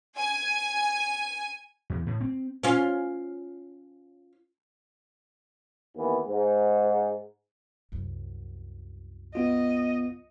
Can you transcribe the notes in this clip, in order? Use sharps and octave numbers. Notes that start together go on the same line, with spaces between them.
G#5
E2
A2
C4
C#4 F4
D#2 E3 B3
G#2
C2 F#2
B3 F4 D#5